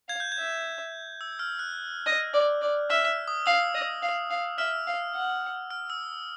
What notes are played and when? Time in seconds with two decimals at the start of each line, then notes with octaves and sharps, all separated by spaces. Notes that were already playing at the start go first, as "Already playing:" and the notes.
0.08 F5 G#6
0.20 G6
0.32 G#6
0.38 E5
1.21 E6
1.39 F6
1.59 F#6
2.06 D#5
2.34 D5
2.62 D5
2.90 E5 F6
3.28 D#6
3.46 F5 E6
3.74 D#5
4.02 F5
4.30 F5
4.58 E5 F6
4.87 F5
5.15 F#5
5.70 F6
5.90 E6